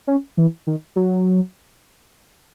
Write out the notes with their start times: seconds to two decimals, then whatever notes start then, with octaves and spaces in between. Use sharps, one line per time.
0.07 C#4
0.37 E3
0.67 D#3
0.96 F#3